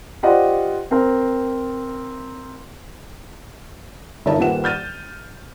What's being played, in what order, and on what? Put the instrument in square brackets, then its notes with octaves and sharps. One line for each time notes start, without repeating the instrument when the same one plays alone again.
[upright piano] F4 G4 C5 D5 D#5 F#5
C4 A#4
[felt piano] G1 D#4 A#4 C#5 E5 A5
D#1 A#3 F4 B4 F#5 E7
F6 G6 A6 D#7